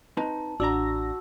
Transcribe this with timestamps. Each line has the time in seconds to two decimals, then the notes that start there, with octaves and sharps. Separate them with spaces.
0.17 C4 D#4 B4 A5
0.60 A1 D4 F#4 D5 A#5 E6 A#6